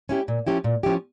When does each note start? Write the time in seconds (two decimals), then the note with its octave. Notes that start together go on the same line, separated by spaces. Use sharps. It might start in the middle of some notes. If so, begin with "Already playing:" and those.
0.09 C#4 E4 G4
0.28 A#2
0.46 F3 C#4 E4 G4
0.64 A#2
0.83 F3 C#4 E4 G4